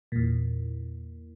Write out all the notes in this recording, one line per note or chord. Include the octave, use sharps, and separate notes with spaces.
E2 A#2